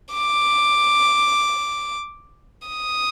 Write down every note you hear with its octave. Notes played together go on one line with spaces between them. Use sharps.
D6
D#6